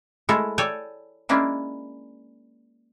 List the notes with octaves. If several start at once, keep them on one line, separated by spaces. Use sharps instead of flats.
G#3 A3 E4 A4 A#4
A4 C#5 D5 G5 G#5
G#3 A#3 C#4 D4 E4